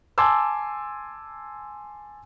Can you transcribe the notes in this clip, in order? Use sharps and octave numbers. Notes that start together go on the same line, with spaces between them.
G#5 A5 C6 D6 E6